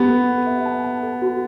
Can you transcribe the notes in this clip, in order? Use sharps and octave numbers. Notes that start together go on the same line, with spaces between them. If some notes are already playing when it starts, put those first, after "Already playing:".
Already playing: B3 G4
A4
A4
E5
A5
A5
A4
F#4